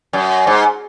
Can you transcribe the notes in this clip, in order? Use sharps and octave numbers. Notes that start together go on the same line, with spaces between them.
F#2
G#2